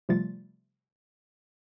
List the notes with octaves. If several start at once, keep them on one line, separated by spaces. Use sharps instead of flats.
C3 F3 G3 A3 F4 A6